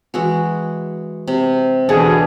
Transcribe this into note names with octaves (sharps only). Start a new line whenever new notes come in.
E3 G#3 F#4
C3
D2 B2 E3 D4 G#4 F#5